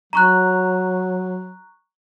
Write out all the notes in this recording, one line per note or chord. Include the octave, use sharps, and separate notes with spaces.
F#3 A#5 C#6 F#6